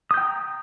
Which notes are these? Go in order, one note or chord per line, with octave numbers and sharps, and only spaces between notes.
G5 A#5 D#6 G6